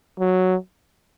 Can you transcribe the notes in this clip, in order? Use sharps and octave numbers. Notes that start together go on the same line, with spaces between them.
F#3